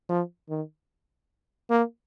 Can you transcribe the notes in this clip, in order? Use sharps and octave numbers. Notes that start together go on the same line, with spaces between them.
F3
D#3
A#3